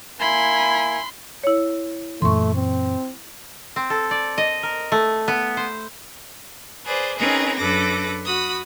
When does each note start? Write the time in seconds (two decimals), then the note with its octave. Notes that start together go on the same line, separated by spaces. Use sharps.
0.20 A#3 E4 G#5 B5 C6
1.43 E4 C#5
2.22 F#2 A#2 E3 A3 C6 C#6
2.55 C4
3.76 C4
3.90 A4
4.11 D5
4.38 D#5
4.63 A#4
4.92 A3
5.28 B3
5.57 C5
6.85 G#4 B4 C5 D5
7.18 C4 C#4 D#4 G#4 A#4 B4
7.58 F#2 D4 A4 B4 D6 A#6
8.25 F#4 B5 D#6